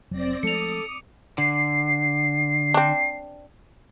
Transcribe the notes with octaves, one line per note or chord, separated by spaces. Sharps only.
F1 F#3 C4 D5 A#6
F3 G#3 A3 A4 D6 D#6 C#7 F7
D3 C7
C4 D4